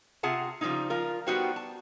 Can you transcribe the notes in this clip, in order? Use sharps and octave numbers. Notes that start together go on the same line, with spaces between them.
C3 F4 G#4 F#5 A5
C#3 F3 G3 G#3 C#4 D#4
F3 F4 A#4
G3 B3 D#4 F#4 C5 G5
A5